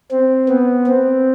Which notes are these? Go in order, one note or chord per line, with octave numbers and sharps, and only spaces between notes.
C4
B3
C4